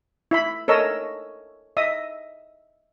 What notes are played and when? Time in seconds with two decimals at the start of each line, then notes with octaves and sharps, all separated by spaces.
0.31 E4 E5 B5
0.68 A4 A#4 C#5 D#5 E6
1.77 D#5 E5 D#6